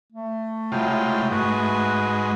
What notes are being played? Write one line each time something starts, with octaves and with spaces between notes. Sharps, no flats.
A3
C3 F#3 G#3 E4 F4 G5
G#2 G#3 F#4 B4